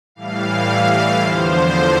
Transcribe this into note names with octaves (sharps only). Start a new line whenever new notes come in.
A2 E3 G3 F5
E2 D3 F3 C5